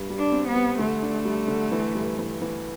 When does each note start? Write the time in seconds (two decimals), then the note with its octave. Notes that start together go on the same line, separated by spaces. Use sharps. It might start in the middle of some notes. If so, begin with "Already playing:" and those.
Already playing: G2
0.10 G3
0.17 D4
0.32 C4
0.48 B3
0.55 G3
0.79 D3 A3
1.03 D4
1.25 G3
1.48 D3
1.72 E3
1.95 G2
2.19 E3
2.42 E3